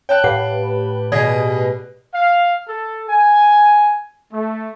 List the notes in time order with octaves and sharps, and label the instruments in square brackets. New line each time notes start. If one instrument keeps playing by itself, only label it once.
[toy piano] C#5 [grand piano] G5 A5 F#6
[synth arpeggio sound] A2 G4 B4 [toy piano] F5 F#5
[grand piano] B2 G#4 D#5 [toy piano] D5
[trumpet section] F5
A4
G#5
A3